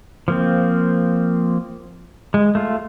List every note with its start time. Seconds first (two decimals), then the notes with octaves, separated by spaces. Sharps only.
0.28 F3 A#3 C4
2.34 G#3
2.55 A3 F4